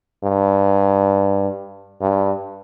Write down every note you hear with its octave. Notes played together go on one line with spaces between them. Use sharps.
G2
G2